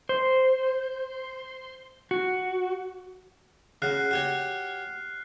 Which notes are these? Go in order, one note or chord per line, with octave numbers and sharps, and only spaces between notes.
C5
F#4
C#3 F#4 F6 F#6 C7
F#4 G4 C#5